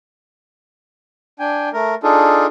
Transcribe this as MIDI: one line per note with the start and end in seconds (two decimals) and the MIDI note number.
1.39 1.69 62
1.39 1.69 79
1.39 1.69 80
1.73 1.95 57
1.73 1.95 70
2.03 2.46 62
2.03 2.46 63
2.03 2.46 65
2.03 2.46 68
2.03 2.46 69